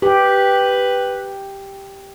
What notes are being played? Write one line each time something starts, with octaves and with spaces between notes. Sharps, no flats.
G4 B4